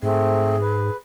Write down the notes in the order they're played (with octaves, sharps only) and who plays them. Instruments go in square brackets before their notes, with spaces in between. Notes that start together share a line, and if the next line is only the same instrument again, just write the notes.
[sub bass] G#2 [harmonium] A3 C4 [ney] G#4
[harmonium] B4